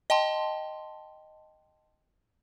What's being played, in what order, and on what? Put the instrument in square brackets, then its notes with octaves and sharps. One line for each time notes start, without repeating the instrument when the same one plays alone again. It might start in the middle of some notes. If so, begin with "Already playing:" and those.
[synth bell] D#5 G5 A5 C6